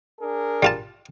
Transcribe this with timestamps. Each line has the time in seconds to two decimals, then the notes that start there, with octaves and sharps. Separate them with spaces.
0.20 D4 G#4 A#4
0.63 G3 F4 A5